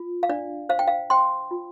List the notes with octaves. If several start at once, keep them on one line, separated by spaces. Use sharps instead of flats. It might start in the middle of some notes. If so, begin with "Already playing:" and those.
Already playing: F4
F5
D4 D5
C5 F5
G5
F5
C5 G5 C6
F4